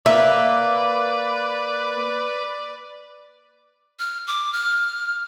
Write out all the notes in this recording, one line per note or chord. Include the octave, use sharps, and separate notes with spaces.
A#3 B4 D5 E5
F6
D6
F6